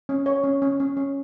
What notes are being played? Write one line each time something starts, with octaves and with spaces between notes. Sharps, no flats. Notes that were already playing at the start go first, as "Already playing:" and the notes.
C#4
C#5
C#4
C#4
C#4
C#4